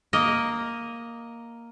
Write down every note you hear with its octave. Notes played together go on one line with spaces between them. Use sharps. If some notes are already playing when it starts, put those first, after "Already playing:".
A#3 A#4 D#5